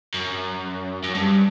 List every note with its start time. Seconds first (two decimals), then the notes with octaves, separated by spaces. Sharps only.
0.14 F#2
1.04 F#2
1.15 G2